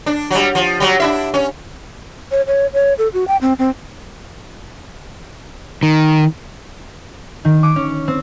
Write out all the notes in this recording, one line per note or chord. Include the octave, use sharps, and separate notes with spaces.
D4
F#3 G3
F3
F#3 G3
D4 E4 E5
C#4
C#5
C#5
C#5
A4
F#4
G5
C4
C4
D#3
D#3
D6
C#4
C4